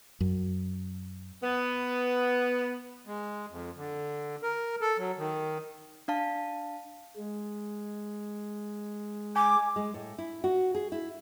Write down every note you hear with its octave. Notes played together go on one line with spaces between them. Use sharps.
F#2
B3
G#3
F2
D3
A#4
A4
F#3
D#3
D4 F5 A5
G#3
G#5 D6
G#3
A2
E4
F#4
G#4
E4